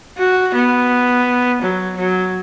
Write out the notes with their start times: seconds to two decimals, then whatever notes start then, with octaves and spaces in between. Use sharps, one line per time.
0.18 F#4
0.54 B3
1.62 F#3
1.97 F#3